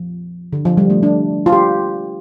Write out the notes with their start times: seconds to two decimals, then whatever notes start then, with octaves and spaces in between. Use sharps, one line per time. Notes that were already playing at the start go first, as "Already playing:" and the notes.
Already playing: F3
0.53 D3
0.65 F3
0.77 G3
0.90 A3
1.03 D4
1.46 F4
1.52 G4